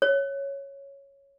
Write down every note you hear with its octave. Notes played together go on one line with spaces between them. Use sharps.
C#5